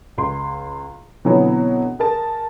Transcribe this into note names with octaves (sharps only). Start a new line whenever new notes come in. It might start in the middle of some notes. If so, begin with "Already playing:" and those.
C#2 C6
B2 D3 E3 F#3 B3 C4
G#4 A#4 A5